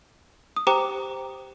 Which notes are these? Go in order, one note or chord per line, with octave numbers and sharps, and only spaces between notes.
D#6
G4 C5 G5 A#5 D6